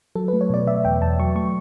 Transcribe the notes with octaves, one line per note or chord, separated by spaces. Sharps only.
F#3 A4
B4
A3
C#5
B2 D5
B2 E5
E2 G5
E2 A5
F#3 C#6
A3 C#6